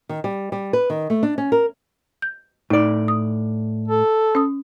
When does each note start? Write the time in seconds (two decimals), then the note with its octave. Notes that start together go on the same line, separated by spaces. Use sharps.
0.09 D#3
0.24 G3
0.52 G3
0.73 B4
0.90 D#3
1.10 A3
1.23 D4
1.38 C#4
1.52 A#4
2.22 G6
2.70 A2 D#4 D5
3.08 D#6
3.88 A4
4.35 C#4 D#6